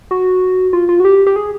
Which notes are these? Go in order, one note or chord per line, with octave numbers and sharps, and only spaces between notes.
F#4
F4
F4
F#4
G4
G4
G#4